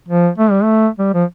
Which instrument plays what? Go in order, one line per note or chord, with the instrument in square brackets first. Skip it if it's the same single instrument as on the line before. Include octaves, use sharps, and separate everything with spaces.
[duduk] F3
A3
G3
A3
G3
F3